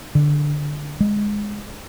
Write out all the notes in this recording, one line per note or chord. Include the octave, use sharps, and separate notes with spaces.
D3
G#3